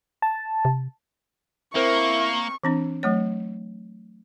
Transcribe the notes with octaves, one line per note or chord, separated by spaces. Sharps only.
A5
C3
A#3 C4 E4 A#4 C5 C#6
E3 C4 D4
F#3 A3 C#5